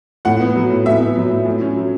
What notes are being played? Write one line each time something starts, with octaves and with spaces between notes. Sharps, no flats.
A2 F#5
B3
F#3
A2
A2 E5
B3
F#3
A2
A2
C#4
F#3